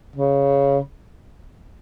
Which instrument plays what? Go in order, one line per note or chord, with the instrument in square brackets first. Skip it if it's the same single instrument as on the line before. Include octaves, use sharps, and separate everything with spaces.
[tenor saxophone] C#3